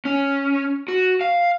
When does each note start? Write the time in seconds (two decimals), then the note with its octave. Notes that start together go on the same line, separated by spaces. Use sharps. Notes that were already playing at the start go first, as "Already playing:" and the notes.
0.05 C#4
0.88 F#4
1.21 F5